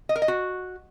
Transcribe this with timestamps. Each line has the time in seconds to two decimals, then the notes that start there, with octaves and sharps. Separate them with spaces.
0.09 D#5
0.16 A#4
0.22 D#5
0.28 F#4